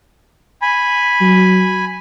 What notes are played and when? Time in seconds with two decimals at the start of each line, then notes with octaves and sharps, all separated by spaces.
0.62 G#5 B5
1.21 F#3